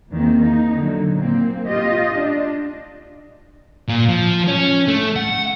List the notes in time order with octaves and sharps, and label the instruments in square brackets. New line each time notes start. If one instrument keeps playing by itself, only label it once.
[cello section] E2 D#3 A#3 C4
D#4
D3 F#3
A#2 A#3 C4
F4 G4 D#5
D4
[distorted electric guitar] A#2
F3
C#4
A3
F#5